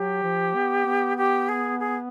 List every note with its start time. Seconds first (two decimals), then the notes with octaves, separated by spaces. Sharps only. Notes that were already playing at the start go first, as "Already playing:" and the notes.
Already playing: F#3 G4
0.23 F3
0.55 B3
0.86 B3
1.17 G4
1.48 G#4
1.79 G#4